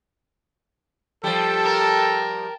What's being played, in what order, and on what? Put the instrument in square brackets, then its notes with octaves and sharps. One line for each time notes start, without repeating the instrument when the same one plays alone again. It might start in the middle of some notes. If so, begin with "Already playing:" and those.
[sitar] F3 G3 [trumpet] A4 [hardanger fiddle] G5 A5
[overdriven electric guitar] A#4